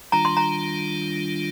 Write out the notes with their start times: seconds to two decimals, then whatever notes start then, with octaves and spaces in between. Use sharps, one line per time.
0.12 D#3 G3 D4 F4 A#5
0.25 C6
0.37 A#5